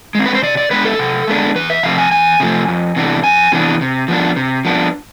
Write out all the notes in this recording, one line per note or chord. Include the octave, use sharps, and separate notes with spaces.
G#3 C4
B4
C5
C3 D5
D5
G#3 B3 D4 B4
A4
C3
G#3 B3 D4
E2 B4
E5
C3 F3 A3 C4 F5
G#5
E2 G#5
C3 F3 A3 C4
F2
C3 E3 B3 D4
F2 G#5
C3 E3 B3 D4
C3
F3 B3 D4
C3
F3 B3 D4